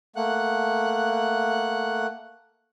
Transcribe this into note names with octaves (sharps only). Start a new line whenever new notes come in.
A3 A#3 F#5 F#6